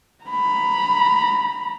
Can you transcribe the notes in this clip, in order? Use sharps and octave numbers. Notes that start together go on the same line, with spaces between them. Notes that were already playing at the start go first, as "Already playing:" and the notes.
A#5 B5